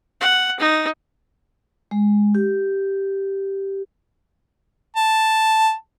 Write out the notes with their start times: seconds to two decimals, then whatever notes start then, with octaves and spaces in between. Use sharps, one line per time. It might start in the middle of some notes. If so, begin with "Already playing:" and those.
0.21 F#5
0.60 D#4
1.91 G#3
2.35 G4
4.96 A5